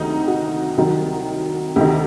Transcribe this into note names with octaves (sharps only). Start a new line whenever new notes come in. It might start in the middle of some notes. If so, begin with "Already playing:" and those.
Already playing: D2 C3 D#3 F#3 D#4
F#4
C2 C3 D#3 F#3
D2 C3 D#3 G4